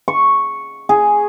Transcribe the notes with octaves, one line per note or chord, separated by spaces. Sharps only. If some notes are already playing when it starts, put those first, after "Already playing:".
C#6
G#4